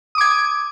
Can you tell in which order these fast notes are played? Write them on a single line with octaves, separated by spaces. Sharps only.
D#6 D6 G#6